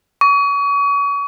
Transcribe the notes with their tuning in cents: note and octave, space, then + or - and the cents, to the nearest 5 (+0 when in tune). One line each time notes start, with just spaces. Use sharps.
C#6 +35